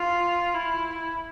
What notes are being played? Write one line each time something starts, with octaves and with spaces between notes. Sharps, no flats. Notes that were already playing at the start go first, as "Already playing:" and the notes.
Already playing: F4
E4